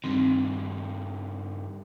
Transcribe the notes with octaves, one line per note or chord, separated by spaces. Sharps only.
G2 D#3 C4